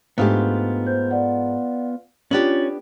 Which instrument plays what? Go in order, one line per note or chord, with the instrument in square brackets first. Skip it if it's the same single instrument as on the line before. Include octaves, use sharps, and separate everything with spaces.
[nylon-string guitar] G#2 A3 G4 [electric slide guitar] B3 F4 [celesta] D4
[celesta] C5 G6
D5 F#5
[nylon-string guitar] B3 D4 G4 [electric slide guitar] C#4 [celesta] F4 A6 F#7